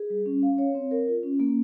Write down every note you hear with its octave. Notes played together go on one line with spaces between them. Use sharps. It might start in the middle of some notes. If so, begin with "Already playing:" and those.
Already playing: G#4
G3
C#4
F5
C#5
C4
A#4
F4
C#4
A#3